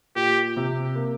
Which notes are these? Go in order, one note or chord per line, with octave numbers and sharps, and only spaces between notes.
A#2 G4
C3
A#3